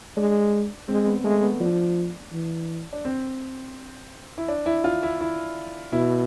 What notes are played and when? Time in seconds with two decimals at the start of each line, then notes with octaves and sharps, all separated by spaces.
0.17 G#3 D4
0.88 G#3 C4
1.07 B3
1.24 G#3 A3
1.42 B3
1.61 F3 D4
2.33 E3
2.93 D4
3.05 C4
4.38 E4
4.48 D4
4.66 E4
4.84 F4
5.03 E4
5.21 E4
5.92 B2 E4